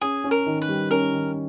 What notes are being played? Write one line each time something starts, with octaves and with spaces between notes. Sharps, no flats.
C#4 G#4
C#4
A#4
D#3
B4
G3
C#4 A#4
D#3